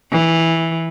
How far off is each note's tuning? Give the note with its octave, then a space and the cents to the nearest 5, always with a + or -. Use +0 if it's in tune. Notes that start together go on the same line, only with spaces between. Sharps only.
E3 -5